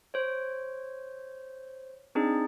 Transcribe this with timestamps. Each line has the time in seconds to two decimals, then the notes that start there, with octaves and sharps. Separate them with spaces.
0.14 C5 C#5
2.15 C4 D4 D#4 G#4